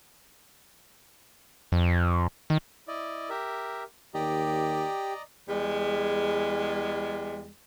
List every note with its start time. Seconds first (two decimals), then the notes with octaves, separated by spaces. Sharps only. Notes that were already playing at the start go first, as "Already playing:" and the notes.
1.72 F2
2.50 D#3
2.88 E4 D5 D#5
3.30 G4 A#4 E5
4.14 D#2 G4 D5 D#5 A#5
5.48 E2 G3 G#3